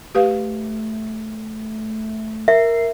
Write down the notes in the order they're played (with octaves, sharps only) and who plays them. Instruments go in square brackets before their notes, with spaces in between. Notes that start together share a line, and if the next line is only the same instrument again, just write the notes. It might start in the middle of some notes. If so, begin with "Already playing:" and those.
[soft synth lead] A3 [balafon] G4 B4 F5
[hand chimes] A#4 [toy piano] E5 [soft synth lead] C7